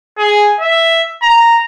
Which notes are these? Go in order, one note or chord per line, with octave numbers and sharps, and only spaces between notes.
G#4
E5
A#5